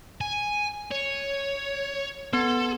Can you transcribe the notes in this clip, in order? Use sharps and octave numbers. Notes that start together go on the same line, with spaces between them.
G#5
C#5
B3 A4